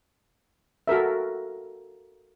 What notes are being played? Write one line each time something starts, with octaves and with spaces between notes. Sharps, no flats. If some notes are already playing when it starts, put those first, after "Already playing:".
F#4 A4 A#4 E5